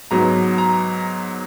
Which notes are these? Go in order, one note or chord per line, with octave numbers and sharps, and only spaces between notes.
G#2 F#3 B3 A#5
A#5